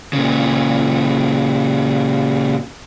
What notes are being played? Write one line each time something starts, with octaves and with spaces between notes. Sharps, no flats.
A#2 C#3